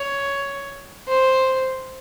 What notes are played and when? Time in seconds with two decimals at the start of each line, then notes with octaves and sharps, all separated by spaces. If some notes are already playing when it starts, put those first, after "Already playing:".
Already playing: C#5
1.08 C5